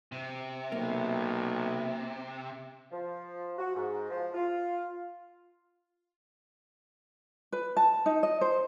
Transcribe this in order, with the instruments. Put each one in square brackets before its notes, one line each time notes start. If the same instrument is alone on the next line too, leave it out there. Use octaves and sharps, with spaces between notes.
[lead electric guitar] C3
[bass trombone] B1 [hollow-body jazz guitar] A#3
[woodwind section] F3
F#4
G#2
F3
F4
[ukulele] B4
A5
D#4
D#5
C5